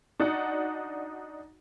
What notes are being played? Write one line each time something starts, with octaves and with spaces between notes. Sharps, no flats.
D4 D#4 F#4 F#5